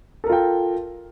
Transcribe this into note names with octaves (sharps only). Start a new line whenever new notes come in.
F4 A4 A#4 G5